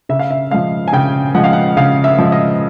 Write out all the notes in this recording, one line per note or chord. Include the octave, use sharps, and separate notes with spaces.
C#3 E5
F5
E5
F3 G#3 F5
G#5
C#3 G5
F3 G#3 F#5
F5
F#5
C#3 F5
E5
F3 G#3
D#5